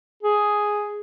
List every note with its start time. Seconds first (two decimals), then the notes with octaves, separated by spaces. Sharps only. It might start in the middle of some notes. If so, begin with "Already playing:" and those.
0.23 G#4